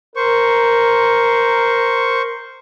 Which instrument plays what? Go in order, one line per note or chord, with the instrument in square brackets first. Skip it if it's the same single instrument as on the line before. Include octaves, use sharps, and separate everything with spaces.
[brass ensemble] A#4 [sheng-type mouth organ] C5 C#6